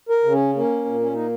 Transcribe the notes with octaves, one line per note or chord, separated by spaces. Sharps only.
A#4
C#3
C#4
A#3 C#4
A#2
C#4
A#3 D#4